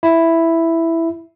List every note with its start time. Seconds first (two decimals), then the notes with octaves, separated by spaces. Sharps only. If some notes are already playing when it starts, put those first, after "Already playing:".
0.03 E4